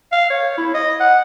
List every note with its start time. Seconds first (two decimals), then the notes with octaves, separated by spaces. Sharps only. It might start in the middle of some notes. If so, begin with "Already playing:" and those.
0.12 F5
0.30 C#5
0.58 E4
0.74 D#5
1.00 F#5